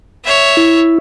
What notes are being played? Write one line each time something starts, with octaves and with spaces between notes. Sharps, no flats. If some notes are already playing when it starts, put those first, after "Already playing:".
C#5 E5
E4